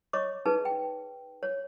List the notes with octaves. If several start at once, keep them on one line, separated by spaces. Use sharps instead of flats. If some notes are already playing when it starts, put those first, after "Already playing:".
C#5 D#5 C#6 D6
D#4 G#4 B4 A5
G5
C#5